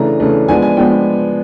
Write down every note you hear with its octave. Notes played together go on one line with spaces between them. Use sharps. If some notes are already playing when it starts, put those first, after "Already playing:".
Already playing: C#3 E3 A3 D4 A#5
C#3 E3 A3 D4
F3 G#3 B3 D4 G#5
G#5
F3 G#3 B3 D4 G5